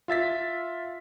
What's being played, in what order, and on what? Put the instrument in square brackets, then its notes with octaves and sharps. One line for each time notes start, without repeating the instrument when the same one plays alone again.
[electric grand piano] F4 E5 A6 B6